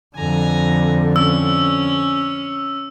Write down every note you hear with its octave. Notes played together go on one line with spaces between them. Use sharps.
F2 D3 G#5 A#5
C#4 E6